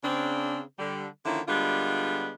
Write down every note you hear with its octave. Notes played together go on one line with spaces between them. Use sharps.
C#3 C4 D4
D3 G3
D3 D#3 F3 A#3 C#4 E4
D3 G3 G#3 B3 D4 F4